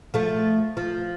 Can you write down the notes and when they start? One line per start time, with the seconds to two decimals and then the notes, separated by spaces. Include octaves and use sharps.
0.14 F3 A3
0.77 F3